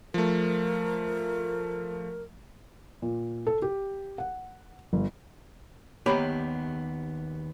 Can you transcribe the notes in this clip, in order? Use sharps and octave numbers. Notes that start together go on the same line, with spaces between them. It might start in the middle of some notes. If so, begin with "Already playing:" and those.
F3 A3 A#4
A#2
A4
G4
F#5
G1
D#2 B3 G4 C#5 A#5 B5